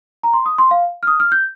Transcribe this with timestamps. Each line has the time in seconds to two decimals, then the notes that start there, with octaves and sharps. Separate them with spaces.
0.23 A#5
0.33 C6
0.46 D#6
0.58 C6
0.71 F5
1.03 F6
1.07 D#6
1.20 F6
1.32 G6